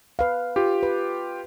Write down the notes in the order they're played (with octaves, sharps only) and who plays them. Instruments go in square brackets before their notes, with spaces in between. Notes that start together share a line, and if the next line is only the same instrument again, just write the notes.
[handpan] B4 F5
[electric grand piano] F4 G4
[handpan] B4